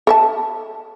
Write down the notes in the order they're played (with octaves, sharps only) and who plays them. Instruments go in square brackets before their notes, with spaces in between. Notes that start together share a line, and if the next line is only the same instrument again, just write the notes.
[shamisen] A4 E5 A5